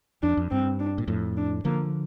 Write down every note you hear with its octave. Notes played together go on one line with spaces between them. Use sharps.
F2 D4
F2
G2 C4
D4
A#2
F2 A2
D4
D3 F3 A#3